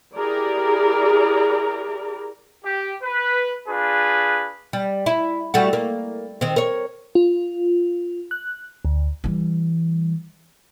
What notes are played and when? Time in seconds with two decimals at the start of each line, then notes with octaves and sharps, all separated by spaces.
0.16 E4 G4 G#4 A#4 D5 A#5
2.65 G4
3.02 B4
3.68 D4 F4 G#4 B4
4.73 G3
5.06 E4
5.54 G3 A3 F#4
5.73 A#3
6.41 D#3 C4
6.56 A#4 C#5
7.15 F4
8.31 F#6
8.85 D2
9.24 E3 G3